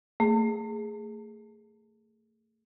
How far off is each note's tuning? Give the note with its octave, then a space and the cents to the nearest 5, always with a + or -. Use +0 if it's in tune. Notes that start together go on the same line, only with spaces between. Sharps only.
A3 +30 G#4 +0